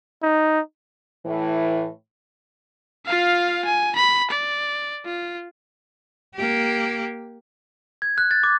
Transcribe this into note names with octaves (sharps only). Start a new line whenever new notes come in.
D#4
A2 E3
F4 F5
G#5
B5
D5
F4
A#3 G4
G#6
F#6
A6
D6